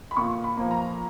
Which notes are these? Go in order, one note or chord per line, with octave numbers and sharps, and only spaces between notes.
B5
A#2 C#6
B5
F3 A#3
A#5